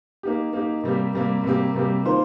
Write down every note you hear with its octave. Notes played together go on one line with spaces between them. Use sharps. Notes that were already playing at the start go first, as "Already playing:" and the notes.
A#3 D#4 G4
A#3 D#4 G4
C3 G3 A#3 G4
C3 G3 A#3 G4
C3 G3 A#3 G4
C3 G3 A#3 G4
D#3 A#3 F4 C5